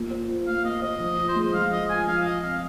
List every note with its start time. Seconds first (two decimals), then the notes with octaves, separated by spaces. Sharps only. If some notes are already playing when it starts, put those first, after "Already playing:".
Already playing: A#3 F4
0.10 C5
0.28 F4
0.47 A#3 F5
0.64 A#3 D#5
0.82 C5 D#5
1.00 F3
1.18 F4
1.29 C5
1.36 G#3 D#5
1.53 F3 F5
1.71 F3 D#5
1.90 F4 G#5
2.07 F3 F5
2.25 F4 D#5
2.43 C4 F5